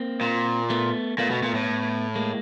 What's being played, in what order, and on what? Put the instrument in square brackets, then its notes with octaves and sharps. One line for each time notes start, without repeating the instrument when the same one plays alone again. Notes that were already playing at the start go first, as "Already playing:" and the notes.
Already playing: [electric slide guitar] A#3 C4
[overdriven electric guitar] A#2
[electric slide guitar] A3 B3
[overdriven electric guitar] A#2 [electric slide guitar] A3 B3
[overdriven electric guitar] B2
A#2
A2
[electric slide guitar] G#3 A#3